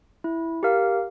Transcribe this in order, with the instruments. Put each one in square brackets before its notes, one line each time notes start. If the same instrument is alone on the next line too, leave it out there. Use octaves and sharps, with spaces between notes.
[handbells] E4
G4 A#4 F5